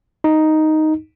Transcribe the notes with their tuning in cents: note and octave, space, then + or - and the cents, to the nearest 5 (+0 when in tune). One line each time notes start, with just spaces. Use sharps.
D#4 +0